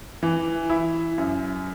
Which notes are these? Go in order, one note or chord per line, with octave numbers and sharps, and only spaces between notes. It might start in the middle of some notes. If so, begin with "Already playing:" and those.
E3
E4
F#2